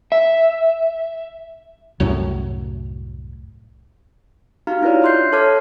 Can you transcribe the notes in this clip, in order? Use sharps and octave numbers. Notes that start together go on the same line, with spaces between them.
E5
C2 F#2 A2 F#3
D#4 F#4 G4 F5 A#5 F6
D4 E4 F4 B4 C#5 D5
D#5 E5 C6 F#6 G6 C7
A4 C#5 A5 D6 F6 G#6